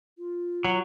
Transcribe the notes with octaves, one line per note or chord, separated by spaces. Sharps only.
F4
F#3